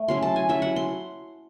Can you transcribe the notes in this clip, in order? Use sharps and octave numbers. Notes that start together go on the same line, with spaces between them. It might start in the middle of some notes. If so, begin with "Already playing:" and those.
Already playing: A3
F#3 C#4 E4 C6
A5
G#5
F#3 C#4 E4 E5
F#5
C6